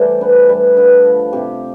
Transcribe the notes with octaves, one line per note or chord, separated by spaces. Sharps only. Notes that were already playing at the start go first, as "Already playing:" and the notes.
Already playing: E3 G3 A3 C5 D5
D3 B4
G3 B4
D3 B4
F3
C3 G4